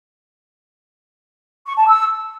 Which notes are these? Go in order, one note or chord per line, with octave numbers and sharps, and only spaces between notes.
C#6
A5
E6